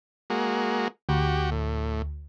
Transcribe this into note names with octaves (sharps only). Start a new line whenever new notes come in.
G#3 A#3 F#4
D2 F#4 G4
A2